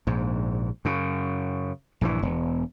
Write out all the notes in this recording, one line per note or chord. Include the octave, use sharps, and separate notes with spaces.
A#1 G#2
F#2 C#3
A#1 G2 D#3 E3
E1